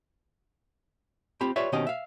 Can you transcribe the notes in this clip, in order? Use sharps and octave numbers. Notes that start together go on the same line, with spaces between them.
C4 F4 G4 B5
F4 G4 B4 C#5 D5 E5
B2 D#3 C4 C#4 G4 D#5
E5 F5